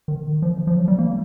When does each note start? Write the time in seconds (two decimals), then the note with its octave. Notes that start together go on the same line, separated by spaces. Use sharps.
0.08 D#3
0.42 F3
0.67 F3
0.76 F#3
0.88 G3
0.99 A#3